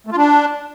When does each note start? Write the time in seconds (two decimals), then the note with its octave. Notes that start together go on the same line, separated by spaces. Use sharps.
0.07 A3
0.12 F4
0.17 D4